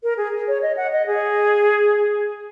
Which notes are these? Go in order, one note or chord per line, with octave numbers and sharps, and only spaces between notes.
A#4
G#4
C#5
D#5
F#5
D#5
G#4